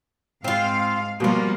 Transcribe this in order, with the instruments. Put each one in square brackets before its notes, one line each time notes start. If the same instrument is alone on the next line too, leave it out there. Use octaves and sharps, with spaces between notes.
[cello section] G#2 F5 [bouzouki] C4 F4
[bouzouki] B2 F4 [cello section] F3 G3 A#3